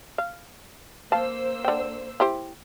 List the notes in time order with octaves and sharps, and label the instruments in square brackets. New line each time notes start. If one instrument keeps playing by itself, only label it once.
[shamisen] F5
[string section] A#3 C5 E6 [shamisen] F5 A5
[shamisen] D3 G5
E4 G4 C5